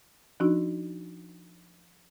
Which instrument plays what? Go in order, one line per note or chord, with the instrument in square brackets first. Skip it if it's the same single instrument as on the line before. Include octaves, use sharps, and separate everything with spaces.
[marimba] F3 D4 D#4 F#4